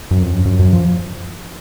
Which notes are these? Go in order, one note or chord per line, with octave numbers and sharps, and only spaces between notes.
F#2
F2
F#2
F#2
F#2
F3